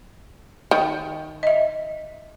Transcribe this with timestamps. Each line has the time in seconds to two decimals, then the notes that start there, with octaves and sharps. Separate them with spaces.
0.71 D#3
1.43 D#5 E5